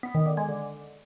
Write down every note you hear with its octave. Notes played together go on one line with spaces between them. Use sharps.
B3
D#3
D3
G#3
D3